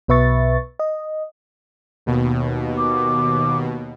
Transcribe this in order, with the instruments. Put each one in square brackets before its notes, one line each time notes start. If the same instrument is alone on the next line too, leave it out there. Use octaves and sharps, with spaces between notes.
[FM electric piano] B1 B2 B4 E5 C#6 A6
D#5
[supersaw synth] D#2 B2
[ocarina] D6